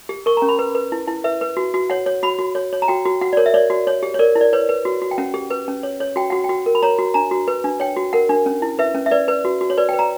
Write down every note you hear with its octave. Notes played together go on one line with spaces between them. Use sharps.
G4
A#4 C#6
A#5
C#4
B5
B4
B4
E4
E4
B4 E5
B4
F#4
F#4
C#5 F#5
C#5
F#4 B5
F#4
C#5
C#5
A#5
F#4 G5
F#4
F#4 F#5
D5
A#4 C#5
E5
C#5 D5
F#4
C#5
G4
C#5
A#4 D5
E4
D5
B4 C#5
B4
F#4
F#4
G5
C#4 F#5
G4
B4
C#4
C#5
C#5
F#4 G5
F#4 F#5
G5
F#4
A#4
B5
C#5 A#5
F#4
D4 A#5
F#4
B4
D4
C#5 G5
F#4
A#4 F#5
D4
C#4
E4
B4 E5
C#4
E5
B4 D5
B4
F#4
F#4
C#5
B4 D5
G5
B4
A#5